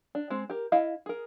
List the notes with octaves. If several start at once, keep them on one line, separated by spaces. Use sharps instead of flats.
D4
G#3 C4
G4 A#4
E4 D#5 F5
G#4 A#4